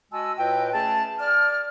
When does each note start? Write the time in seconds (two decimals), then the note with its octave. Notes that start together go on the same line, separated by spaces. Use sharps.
0.12 G#3 F#4 D#5 G#5 A5 E6
0.38 A2 F4 B4 D#5 G5
0.73 A3 C#4 G#4 A5
1.19 D5 F6